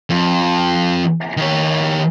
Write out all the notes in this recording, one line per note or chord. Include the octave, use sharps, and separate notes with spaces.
F2
D#3 C#5